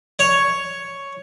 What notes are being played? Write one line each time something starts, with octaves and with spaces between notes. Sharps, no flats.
C#5